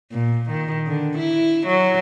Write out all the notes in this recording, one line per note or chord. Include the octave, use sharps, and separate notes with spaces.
A#2
D#3
D3
E4
F#3